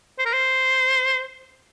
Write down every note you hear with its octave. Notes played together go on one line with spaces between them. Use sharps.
C5
A#4
C5